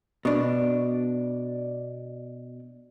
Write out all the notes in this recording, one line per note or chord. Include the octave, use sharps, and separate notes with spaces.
B2 D4